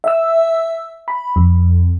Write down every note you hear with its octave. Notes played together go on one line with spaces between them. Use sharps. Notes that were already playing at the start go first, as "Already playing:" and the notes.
E5 E6
B5
F2